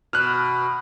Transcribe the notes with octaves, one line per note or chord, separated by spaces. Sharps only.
B2 F6 F#6